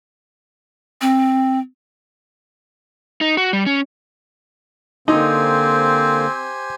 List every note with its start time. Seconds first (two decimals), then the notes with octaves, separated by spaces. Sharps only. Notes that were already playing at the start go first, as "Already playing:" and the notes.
1.01 C4
3.21 D#4
3.37 F#4
3.53 G3
3.66 C#4
5.08 D3 A#3 C4 D#4 G4 C5 G#5